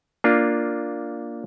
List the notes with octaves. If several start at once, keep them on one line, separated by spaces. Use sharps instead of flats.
A#3 D4 F4